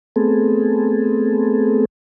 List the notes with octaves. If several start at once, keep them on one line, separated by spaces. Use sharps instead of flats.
A3 B3 C4 G#4 A4